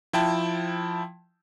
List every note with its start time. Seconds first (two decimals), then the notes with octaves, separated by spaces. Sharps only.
0.13 F3 E4 G5 A5